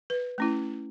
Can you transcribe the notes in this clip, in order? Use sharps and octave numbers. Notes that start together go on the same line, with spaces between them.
B4
A3 C#4 E4